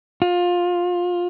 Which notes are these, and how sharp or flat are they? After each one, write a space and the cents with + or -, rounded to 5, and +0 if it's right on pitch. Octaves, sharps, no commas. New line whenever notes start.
F4 +20